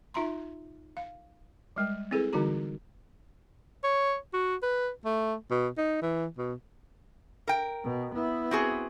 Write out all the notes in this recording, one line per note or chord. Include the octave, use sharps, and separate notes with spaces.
D#4 F4 E5 A#5 C6
F5
G3 G#3 G5
C4 E4 G#4 A4 B4
D3 E3 G3 D#4 F#4 A#5
C#5
F#4
B4
A3
B2
D#4
E3
B2
A#4 G5
B2
B3 E4
C4 F#4 G#4